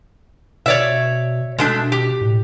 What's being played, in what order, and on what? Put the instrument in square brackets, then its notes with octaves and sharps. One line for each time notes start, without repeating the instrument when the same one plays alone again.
[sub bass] B2 [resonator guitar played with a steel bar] C#5 D5 E5
[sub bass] B2 [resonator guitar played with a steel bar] G#3 A3 D4
[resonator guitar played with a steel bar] G4
[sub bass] A2